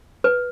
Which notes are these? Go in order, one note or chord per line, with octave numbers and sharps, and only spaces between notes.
B4